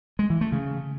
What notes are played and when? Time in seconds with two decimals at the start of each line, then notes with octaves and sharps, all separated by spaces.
0.19 G#3
0.30 E3
0.41 A3
0.52 C#3